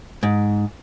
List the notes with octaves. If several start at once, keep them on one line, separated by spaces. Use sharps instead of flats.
G#2